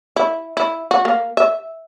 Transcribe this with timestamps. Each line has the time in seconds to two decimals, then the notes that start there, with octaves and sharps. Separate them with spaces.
0.16 E4
0.57 E4
0.91 F#4
1.05 A#3
1.37 E5